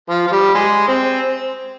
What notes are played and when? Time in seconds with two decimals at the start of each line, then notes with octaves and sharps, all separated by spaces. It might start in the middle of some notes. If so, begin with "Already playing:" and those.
0.10 F3
0.27 F3
0.32 G3
0.54 G#3
0.88 C4